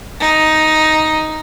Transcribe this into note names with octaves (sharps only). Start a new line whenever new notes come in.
D#4